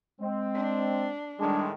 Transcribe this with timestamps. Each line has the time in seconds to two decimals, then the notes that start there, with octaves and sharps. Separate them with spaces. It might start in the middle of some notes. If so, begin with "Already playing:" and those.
0.21 G#3 C4
0.55 D4
1.40 A2 D#3 G3 G#3 D4